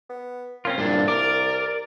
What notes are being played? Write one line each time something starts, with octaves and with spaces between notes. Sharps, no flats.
B3
A#3 C4 C#4 F4
C2 G2 A#2 D4
A#4 D5